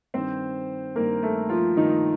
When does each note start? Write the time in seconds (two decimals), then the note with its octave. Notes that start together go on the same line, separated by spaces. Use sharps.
0.14 G2 D#3 C4 C5
0.95 G2 D#3 A#3 A#4
1.23 A3 A4
1.49 F3 F4
1.77 G2 D#3 D#4